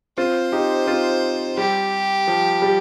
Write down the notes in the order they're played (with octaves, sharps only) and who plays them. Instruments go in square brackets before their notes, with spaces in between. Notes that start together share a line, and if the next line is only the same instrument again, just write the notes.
[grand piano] C4 F4 [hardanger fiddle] C5
[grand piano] D#4 G4
C4 F4
[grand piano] G3 [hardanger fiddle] G4
[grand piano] F3
G3